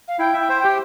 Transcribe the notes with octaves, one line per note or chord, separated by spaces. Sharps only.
F5
E4 G5
E5
G5
C5
G4 G5